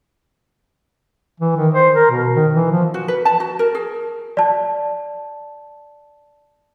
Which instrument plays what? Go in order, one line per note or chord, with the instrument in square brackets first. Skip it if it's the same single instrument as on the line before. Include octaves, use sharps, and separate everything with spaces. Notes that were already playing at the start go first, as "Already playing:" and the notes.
[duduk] E3
D#3
C5
A#4
B2
D#3
E3
F3
[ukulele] F#4
B4
A5
F#4
A#4
G#4
[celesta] D5 A5